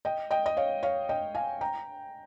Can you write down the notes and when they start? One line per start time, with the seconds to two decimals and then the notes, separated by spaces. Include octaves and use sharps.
0.05 D#5 G5
0.31 D#5 G5
0.46 D#5
0.57 C#5 F5
0.83 C#5 F5
1.09 D#5 G5
1.35 F5 G#5
1.61 G5 A#5